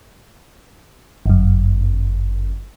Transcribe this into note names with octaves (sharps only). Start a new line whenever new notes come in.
G1 F#2